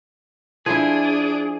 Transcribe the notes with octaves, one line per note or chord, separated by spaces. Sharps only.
F3 D4 E4 G#4 G#6